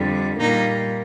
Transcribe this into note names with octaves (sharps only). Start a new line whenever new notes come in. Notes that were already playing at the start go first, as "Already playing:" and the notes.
Already playing: F2 D3 G3
A#2 G3 A#3 D#4